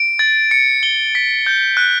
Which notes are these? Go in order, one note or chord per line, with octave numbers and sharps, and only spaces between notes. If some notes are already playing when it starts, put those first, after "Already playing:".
Already playing: D7
A6
C#7
G7
B6
G6
F#6